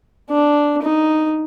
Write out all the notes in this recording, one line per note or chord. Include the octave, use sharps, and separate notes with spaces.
D4
D#4